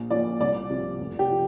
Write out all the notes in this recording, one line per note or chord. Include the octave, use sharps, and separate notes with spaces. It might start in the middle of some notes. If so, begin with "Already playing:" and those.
Already playing: A#1
A#2 F3 D5
C2 D5
C3 F3
F1
G4
F3